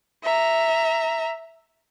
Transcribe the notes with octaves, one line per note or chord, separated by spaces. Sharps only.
E5 A#5